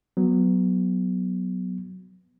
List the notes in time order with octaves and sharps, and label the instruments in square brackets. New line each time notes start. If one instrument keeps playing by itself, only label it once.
[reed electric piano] F#3 B3